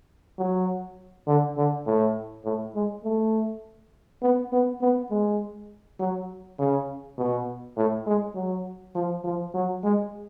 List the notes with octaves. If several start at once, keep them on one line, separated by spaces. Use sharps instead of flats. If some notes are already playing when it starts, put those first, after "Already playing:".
F#3
D3
D3
A2
A2
G#3
A3
B3
B3
B3
G#3
F#3
C#3
B2
A2
G#3
F#3
F3
F3
F#3
G#3